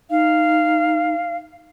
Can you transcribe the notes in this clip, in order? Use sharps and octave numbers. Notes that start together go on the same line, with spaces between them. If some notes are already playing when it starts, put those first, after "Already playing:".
D#4 F5